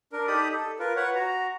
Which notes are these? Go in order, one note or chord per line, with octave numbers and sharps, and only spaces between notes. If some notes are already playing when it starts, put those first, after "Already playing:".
D4 A#4
D#4 G4 A4 D5 B5 D#6
A4
F4 A#4 B4
B4 C#5 F#5
F#4 A#5